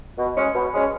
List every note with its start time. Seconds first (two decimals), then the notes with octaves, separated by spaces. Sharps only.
0.18 B2
0.37 G#3 C#4
0.55 B2
0.73 G#3 C#4